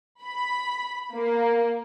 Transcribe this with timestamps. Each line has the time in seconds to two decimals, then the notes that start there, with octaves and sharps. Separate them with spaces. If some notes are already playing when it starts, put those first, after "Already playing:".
0.23 B5
1.15 A#3